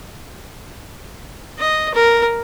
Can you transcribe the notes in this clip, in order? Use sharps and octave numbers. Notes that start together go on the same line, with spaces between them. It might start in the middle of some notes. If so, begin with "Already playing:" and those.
D#5
A#4